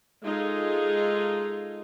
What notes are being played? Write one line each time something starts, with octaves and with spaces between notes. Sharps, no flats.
G#3 D#4 F4 G#4 A4